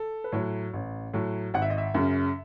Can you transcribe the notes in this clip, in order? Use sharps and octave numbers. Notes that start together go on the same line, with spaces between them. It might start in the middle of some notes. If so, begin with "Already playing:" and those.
Already playing: A4
B4
A2 F#3 C#5
A1
A2 F#3
G#1 F#5
E5
D#5
E5
F#2 C#3